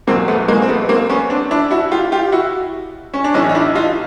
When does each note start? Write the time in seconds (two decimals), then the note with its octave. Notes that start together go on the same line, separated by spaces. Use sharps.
0.07 E2 B2 F#3 A#3 C4
0.28 A3 B3
0.48 G#3 A#3
0.62 C4
0.69 A3 B3
0.89 A#3 C4
1.10 B3 C#4
1.30 C4 D4
1.51 D4 E4
1.71 E4 F#4
1.92 F4 G4
2.12 F4 G4
2.32 E4 F#4
3.14 C#4
3.24 D4
3.34 B1 A2 E3 C#4 D#4
3.49 D#4
3.55 D4 E4
3.75 D#4 F4